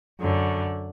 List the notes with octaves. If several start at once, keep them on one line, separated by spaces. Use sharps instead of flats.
F#2 D3